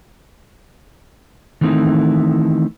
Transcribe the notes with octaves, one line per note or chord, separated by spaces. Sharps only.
D#3 E3 A3 C4 D#4 E4